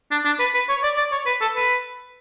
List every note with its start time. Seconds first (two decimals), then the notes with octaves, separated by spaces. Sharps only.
0.12 D4
0.25 D4
0.40 B4
0.55 B4
0.69 C#5
0.84 D5
0.98 D5
1.12 C#5
1.27 B4
1.42 A4
1.56 B4